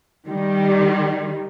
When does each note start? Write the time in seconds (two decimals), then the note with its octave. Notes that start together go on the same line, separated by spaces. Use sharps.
0.27 D#3 G3